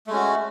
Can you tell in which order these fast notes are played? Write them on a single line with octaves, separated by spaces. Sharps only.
A3 G#3 C#4 F#4